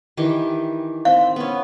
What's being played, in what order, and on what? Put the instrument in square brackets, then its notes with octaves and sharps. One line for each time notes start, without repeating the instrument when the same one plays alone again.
[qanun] D#3 E3 G4
[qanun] C4 [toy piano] F5
[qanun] B3 C#4